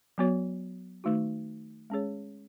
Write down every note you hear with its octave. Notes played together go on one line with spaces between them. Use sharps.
F#3 B3 F#4 C#5
D#3 A3 D#4 F#4
G#3 C#4 G#4 C#5